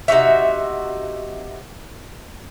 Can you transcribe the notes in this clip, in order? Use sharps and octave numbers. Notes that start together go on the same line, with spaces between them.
C3 D#4 F#4 E5